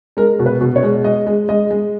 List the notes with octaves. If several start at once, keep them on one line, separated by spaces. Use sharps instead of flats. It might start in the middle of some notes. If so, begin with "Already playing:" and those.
G#3 A#4
B2
B4
B2
C#5
G#3
G#3 D#5
G#3
G#3 D#5
G#3